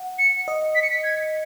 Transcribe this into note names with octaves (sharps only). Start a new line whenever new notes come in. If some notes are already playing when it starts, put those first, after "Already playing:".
Already playing: F#5
C#7
D#5
B6
C#7
B6
G#6